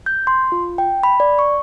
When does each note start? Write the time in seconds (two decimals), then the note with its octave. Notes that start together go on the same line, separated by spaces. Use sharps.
0.06 G6
0.27 C6
0.52 F4
0.78 G5
1.03 B5
1.20 D5
1.39 C#6